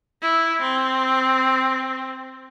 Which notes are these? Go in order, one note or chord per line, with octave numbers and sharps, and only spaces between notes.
E4
C4